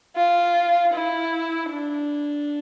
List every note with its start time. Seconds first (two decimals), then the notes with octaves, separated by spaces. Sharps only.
0.16 F4
0.94 E4
1.71 D4